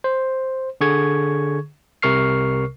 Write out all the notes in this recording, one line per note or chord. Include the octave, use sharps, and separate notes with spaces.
C5
D3 G#4 C#6 G#6
C2 C3 A#4 C#6 F6 C7